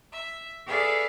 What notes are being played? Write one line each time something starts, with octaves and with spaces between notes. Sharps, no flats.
E5
G#4 A4 B4 D5 E5 F5